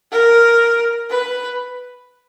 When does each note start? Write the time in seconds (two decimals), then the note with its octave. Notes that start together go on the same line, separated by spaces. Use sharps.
0.12 A#4
1.11 B4